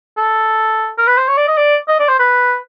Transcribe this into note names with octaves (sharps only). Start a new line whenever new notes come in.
A4
A#4
B4
C5
C#5
D5
D#5
D5
D#5
D5
C5
B4